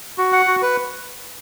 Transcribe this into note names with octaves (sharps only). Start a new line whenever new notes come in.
F#4
F#5
F#4
B4